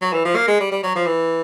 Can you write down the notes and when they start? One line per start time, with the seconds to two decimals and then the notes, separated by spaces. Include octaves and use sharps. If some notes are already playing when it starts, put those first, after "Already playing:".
0.01 F#3
0.13 E3
0.25 F3
0.36 A#3
0.48 G#3
0.60 G3
0.72 G3
0.84 F#3
0.96 F3
1.06 E3